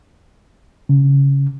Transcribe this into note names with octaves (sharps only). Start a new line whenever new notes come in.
C#3